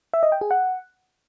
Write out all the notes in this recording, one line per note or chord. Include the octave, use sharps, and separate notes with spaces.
E5
D#5
G5
G#4
F#5